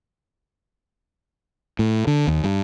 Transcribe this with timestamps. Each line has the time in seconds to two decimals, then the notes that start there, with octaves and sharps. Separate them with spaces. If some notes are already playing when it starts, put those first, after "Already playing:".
1.79 A2
2.07 D3
2.28 D#2
2.44 G2